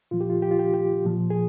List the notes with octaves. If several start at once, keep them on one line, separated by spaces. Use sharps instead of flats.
A#2 F3 F4
G4
F4
G4
F4
G4
G4
A#2 F3
G#4